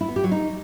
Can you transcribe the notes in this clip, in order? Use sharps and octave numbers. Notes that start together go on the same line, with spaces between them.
E4
B3
G4
F#3
D#4